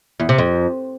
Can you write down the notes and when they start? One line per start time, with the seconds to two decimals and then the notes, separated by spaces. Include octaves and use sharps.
0.20 E2
0.29 C3
0.38 F2